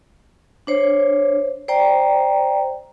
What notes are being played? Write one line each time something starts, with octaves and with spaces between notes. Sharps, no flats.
D4 C5 C#5
C5 D5 G5 A#5